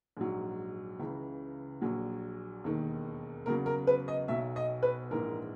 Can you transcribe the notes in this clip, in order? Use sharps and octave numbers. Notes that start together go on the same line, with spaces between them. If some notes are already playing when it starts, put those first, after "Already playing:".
A#1 G#2 F#3
C#2 C#3 E3
A#1 A#2 F#3
E1 D#2 D#3
E2 C#3 F#3 A#4
A#4
B4
D#5
B1 B2 F#3 E5
D#5
B4
A#1 G#2 E3 A#4